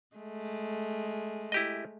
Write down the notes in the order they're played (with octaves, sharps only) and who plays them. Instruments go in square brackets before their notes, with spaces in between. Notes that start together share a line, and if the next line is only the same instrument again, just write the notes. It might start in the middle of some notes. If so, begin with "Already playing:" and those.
[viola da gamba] G#3 A3
[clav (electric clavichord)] E4 G4 D#5